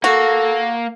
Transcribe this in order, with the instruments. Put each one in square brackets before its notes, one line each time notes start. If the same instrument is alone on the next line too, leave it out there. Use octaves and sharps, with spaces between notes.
[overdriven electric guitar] A#3 [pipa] F#4 [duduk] A4